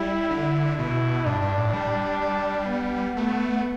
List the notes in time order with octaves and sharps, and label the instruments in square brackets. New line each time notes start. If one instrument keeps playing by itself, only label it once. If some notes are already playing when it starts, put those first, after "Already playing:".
Already playing: [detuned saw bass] G3 [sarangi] E4
[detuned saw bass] D3
[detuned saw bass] B2 [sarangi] E4
[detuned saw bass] G2 [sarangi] D4
[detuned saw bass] G2
A2
[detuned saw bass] G3 [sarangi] D4
[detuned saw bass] G3
[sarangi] B3
[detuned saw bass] A3 [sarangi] B3